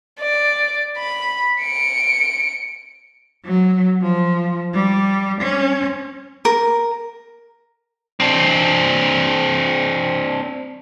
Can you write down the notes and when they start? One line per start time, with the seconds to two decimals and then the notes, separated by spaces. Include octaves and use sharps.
0.20 D5
0.97 B5
1.62 C#7 D7
3.45 F#3
4.02 F3
4.73 G3
5.42 C#4
6.45 A#4
8.20 C4 D4